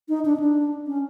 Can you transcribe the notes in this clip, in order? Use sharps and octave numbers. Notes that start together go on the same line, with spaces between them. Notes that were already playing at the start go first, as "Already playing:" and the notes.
D#4
D4
C#4
D4
C#4